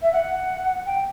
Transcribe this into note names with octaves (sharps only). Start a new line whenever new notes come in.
E5
F#5
G5